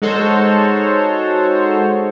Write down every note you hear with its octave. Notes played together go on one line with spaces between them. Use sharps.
G#3 D#4 F#4 A4 C5 C#5